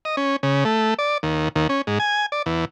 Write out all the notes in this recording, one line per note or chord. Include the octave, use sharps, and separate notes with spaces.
D#5
C#4
C#3
A3
D5
D#2
D#2
C#4
G#2
G#5
D5
E2